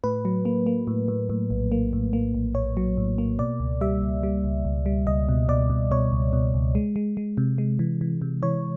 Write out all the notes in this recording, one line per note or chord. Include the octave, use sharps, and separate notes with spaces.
A2 B4
F#3
A#3
A#3
A2
A2
A2
A#1
A#3
A2
A#3
A#1
A#1 C#5
F#3
A2
A#3
B2 D5
C#2
G3 E5
C#2
G3
C#2
C#2
G3
C#2 D#5
B2
B2 D5
B2
B2 C#5
C#2
B2
C#2
G#3
G#3
G#3
C3
G#3
E3
E3
C3
E3 C#5